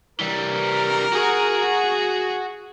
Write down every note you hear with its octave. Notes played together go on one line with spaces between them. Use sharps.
E3 G3 A#4
F#4 G#4 F#5